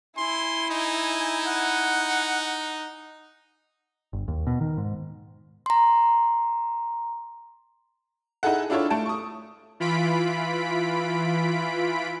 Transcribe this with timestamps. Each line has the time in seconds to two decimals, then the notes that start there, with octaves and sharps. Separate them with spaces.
0.18 E4 G#5 C6
0.70 D#4
1.46 F#5
4.13 G1
4.28 D#2
4.47 B2
4.61 D#3
4.78 G#2
5.66 A#5 C6
8.43 D#4 E4 G#4 A4 F#5
8.70 D4 E4 F4 A4 C#5
8.90 A3 A5 D7
9.06 C#6 D#6
9.80 E3 F4 B5 B6 D7